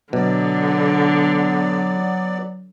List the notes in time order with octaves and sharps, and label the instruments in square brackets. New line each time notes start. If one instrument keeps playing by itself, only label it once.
[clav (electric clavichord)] B2 [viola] D3 [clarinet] F#3 [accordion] B3 D5